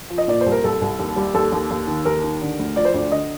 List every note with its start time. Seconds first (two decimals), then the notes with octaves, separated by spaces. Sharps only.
0.10 F3
0.18 D#5
0.28 A#2 D5
0.41 C2 C5
0.52 A#4
0.64 C2 A4
0.81 C2
0.99 D#2
1.16 G3
1.34 D#2 A4
1.52 D#2
1.71 D#2
1.87 D#3
2.05 D#2 A#4
2.24 D#3
2.41 D3
2.59 D2
2.76 F3 D5
2.85 C5
2.94 D2 D5
3.12 D3 D#5